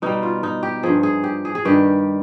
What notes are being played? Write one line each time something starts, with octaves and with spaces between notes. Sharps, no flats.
B2 G3 D#4
F4
D#4
G4
G2 F3 G#4
G#4
G4
G#4
G#4
G2 D#3 G3 G4